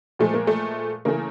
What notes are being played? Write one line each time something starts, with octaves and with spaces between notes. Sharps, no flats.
A#2 F3 G#3 A3
A#3
A3
C#3 E3 A3 A#3